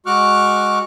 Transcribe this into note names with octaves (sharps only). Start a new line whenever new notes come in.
G#3 F#4 C#6 D6 F6 F#6